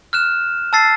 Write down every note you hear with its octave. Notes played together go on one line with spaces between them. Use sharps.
F6 F#6 E7
A5 E6 A6 C7